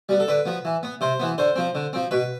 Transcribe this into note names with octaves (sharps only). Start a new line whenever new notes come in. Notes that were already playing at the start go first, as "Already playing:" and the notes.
G3 B3
A4
D3 B4
F3 B3
E3
B3
C3 C5
E3 B3
D3 C5
F3 C4
D3
F3 C4
B2 B4